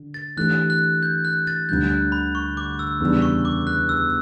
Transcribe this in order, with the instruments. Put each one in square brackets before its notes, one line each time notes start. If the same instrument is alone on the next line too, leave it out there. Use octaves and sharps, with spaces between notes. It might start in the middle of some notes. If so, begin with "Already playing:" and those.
Already playing: [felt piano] D3
[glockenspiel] A6
[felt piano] E3 A3 D4 G4 [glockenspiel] F#6
[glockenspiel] F#6
G6
F#6
A6
[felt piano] D2 D3 G3 [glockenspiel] G6
[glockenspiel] F#6
B5
C#6
D6
E6
[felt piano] E2 C#3 G3 D4
[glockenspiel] C#6
D6
F#6
E6